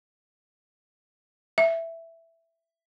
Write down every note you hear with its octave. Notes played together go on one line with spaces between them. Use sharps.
E5